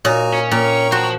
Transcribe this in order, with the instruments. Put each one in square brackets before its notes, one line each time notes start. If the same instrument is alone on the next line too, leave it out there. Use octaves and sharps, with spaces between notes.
[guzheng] A#2 [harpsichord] D#4 C#5 [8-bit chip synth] F#4 G#5 A#5
[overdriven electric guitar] C#4
[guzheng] A#2 [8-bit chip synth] G5 A#5 C#6
[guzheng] F#4 [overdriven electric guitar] C5 A5